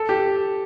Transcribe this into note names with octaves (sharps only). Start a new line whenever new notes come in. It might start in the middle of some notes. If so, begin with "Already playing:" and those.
Already playing: A4
G4